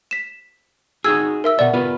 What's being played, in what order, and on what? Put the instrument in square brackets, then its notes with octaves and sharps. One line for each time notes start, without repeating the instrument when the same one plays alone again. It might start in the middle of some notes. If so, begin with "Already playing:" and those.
[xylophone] B6 E7
[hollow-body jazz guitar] D#4 F#4 G#4 [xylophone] E6 G#6
[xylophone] A#4 E5 E6
[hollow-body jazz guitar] B2 E5 [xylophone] D5 F#5
[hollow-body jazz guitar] B3 F4 B4